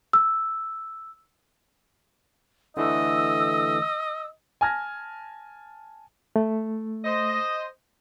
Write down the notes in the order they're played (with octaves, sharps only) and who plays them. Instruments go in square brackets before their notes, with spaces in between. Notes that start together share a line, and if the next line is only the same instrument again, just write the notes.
[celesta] E6
[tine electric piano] D3 E3 A3 [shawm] D#5 [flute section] E6
[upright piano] G#5 A5 F6 G#6 A#6
[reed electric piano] A3
[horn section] C5 D#5